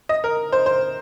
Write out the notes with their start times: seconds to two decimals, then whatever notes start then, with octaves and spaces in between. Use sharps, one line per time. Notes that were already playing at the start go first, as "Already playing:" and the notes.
0.09 D#5
0.24 A#4
0.52 C5
0.66 C5